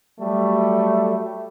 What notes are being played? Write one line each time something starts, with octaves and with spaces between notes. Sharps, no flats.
F#3 G3 A3